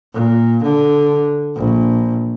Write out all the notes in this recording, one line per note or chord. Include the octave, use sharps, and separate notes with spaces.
A#2
D3
A#1